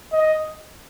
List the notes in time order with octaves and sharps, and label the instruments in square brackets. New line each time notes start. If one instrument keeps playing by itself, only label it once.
[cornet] D#5